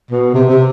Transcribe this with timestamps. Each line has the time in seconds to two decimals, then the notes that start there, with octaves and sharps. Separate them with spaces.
0.11 B2
0.34 C3
0.50 C3